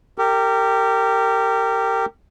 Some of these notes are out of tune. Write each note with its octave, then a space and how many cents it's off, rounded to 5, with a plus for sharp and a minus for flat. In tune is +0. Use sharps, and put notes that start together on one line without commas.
G4 +0 A#4 -30